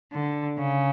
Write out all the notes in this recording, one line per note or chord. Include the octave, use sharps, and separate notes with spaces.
D3
C#3